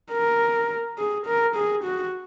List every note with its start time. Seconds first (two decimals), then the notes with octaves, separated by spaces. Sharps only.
0.12 A#4
0.98 G#4
1.26 A#4
1.55 G#4
1.84 F#4